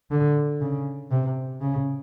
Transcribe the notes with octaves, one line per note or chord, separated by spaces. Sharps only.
D3
C#3
C3
C#3